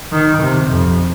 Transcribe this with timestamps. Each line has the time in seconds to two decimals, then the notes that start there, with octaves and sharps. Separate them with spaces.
0.12 D#3
0.42 C3
0.70 F2